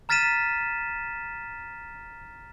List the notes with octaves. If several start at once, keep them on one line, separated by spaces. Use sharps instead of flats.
A#5 F6 A6 B6 D#7 E7